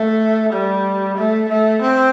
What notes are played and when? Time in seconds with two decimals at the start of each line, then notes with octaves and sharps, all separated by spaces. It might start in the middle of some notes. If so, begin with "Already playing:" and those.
Already playing: A3
0.53 G3
1.18 A3
1.49 A3
1.82 C4